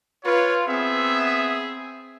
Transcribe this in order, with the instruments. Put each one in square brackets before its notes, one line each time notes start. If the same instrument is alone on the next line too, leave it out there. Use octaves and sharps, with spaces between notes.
[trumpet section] F4 [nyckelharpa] B4 [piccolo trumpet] C#5
[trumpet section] B3 E5 [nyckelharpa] C4 [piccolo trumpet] G#4